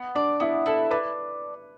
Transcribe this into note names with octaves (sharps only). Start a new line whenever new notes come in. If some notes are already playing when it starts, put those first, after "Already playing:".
Already playing: B3
D4 D5
B3 E4
E4 A4
D4 B4